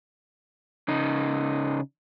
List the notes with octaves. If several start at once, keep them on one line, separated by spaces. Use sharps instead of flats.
C#3 D#4